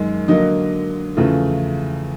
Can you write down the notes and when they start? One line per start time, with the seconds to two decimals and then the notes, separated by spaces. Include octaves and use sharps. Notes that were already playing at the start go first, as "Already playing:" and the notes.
Already playing: F#2 D#3 G#3
0.28 D3 F#3 A#3 D#5
1.17 E2 C#3 F3 A3